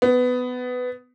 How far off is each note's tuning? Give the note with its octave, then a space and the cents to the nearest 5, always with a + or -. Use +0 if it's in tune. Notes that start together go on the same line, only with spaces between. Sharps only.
B3 +15